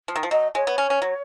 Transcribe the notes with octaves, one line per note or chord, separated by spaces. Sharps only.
F3
D#3
F3
F#3 D#5
G#3 C#5
B3
C#4
C#4
F#3